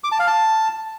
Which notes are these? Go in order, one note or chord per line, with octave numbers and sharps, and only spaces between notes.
D6
A5
F5
A5